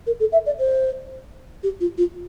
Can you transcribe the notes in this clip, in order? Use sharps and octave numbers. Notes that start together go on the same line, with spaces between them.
A#4
A4
E5
D5
C5
G4
F4
F4